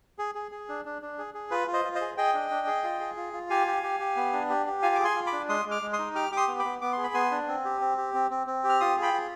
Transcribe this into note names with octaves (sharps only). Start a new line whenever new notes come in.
G#4
G#4
G#4
D4
D4
D4
G#4
G#4
F4 B4
F4
C5 D#5
F4
C5 D#5
G#4
G#4 D#5 G5
D4
D4
G#4
F4
G#4
F4
F4
G4 F5 G#5
G4
G4
G4
B3
D4
G4
G4
F4 F5 G#5
G#4 D6
G#5 C6
F4
B5 D6
D4
G#3 C6 D#6
G#3
D6 F6
G#3
C6 D#6
D#4
G4 D6 F6
G4 D6
C6 D#6
B3
B5 D6
B3
B3 D6
C6
G#4
B5
B3 G#5 C6
D4
C4
G4
C4
G4
C4
C4
C4
G4
F6
F4 C6 D#6
G#4
G5 B5
F4